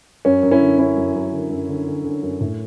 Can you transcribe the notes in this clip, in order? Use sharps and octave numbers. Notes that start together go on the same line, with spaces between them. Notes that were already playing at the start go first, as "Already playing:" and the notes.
F#2 C#4
F#2
C#4 E4
D3
F#2 C#4 E4
F#2
F#2
D3
F#2
D3
D3
D3
F#2
A2